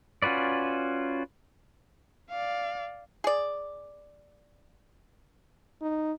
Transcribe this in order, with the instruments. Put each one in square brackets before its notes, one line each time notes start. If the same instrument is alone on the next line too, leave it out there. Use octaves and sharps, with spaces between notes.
[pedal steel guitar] C#4 F4 F#4 B4 D5
[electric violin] D5 F5
[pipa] G#4 D5
[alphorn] D#4